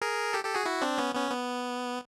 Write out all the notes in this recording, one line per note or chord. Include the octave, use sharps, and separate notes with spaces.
G#4 A#4
G4 A4
G4 A4
F#4 G#4
E4 F#4
C4 D4
B3 C#4
B3 C#4
B3